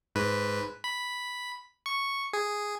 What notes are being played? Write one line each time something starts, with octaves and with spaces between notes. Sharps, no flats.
G#2 B4
B5
C#6
G#4